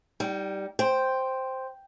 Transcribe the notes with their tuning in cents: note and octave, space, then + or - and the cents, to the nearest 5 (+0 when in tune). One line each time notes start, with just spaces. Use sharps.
G3 +0 D#4 +20 G5 -40
C5 +0 G5 +0